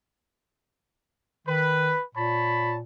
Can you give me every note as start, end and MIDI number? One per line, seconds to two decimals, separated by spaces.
1.48 1.94 51
1.48 2.02 71
2.15 2.82 46
2.15 2.76 73
2.15 2.76 81
2.15 2.76 83